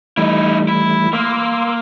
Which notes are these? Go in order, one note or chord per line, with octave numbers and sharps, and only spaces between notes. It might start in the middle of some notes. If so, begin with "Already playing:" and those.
E3 G3 A3 D#4 E4
E4
A#3 C6 D6 E6